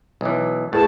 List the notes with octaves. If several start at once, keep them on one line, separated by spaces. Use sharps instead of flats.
B1 E3
E2 A2 A5